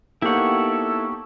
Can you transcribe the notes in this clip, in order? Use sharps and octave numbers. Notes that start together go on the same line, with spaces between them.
A#3 B3 D#4 E4 G4 A4 C#5 F#5